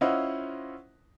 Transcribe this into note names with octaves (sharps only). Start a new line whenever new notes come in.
C#4 E4 F4 C5 D#5 F#5